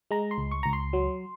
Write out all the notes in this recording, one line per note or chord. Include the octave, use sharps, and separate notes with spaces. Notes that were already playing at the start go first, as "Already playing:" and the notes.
G#3 A#5
C6
C#2
C#6
C#2 A#5
C6
F#3